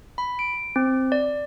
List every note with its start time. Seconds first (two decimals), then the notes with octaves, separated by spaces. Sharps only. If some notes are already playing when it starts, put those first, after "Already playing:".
0.18 B5
0.39 D7
0.76 C4
1.12 D5